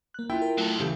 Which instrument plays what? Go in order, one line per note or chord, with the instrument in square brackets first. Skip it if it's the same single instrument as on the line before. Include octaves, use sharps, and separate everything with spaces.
[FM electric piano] A#3 F#6
[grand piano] E4 [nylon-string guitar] F4 G5
[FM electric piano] A#4
[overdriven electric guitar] F#3 A4 [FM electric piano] A3
[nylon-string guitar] C#3 E3 A3 [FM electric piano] G4 G6